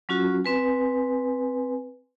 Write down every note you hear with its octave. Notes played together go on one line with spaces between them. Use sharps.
F#3 C#4 F4 F#4
C4 B4 G#5